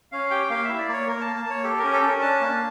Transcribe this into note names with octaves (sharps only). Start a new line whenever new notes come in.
C#4 F5
G4 G5
A#3 F5
E4 E5
D5
A#3 C#5
A#3 A#4
A5
A#3
A5
A#3 C#5
G4 A4
A#4
C#4
A4
C#4
A#4
D4 A5
A#3